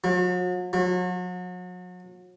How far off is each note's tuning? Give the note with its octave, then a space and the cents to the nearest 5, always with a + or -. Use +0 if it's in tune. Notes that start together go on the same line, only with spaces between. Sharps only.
F#3 -45
F#3 -40